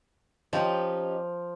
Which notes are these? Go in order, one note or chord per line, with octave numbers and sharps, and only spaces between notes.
F3 C#4 D#4 G4